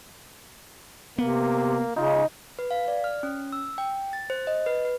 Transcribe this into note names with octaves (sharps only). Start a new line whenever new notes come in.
C3 A#3 B3
C#3 D#4 F4
B4
F5
D5
F6
C#4
E6
G5
A6
C5
D#5
B4
B4